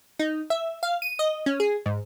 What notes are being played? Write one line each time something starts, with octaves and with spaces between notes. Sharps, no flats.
D#4
E5
F5
D#7
D#5
C#4
G#4
G#2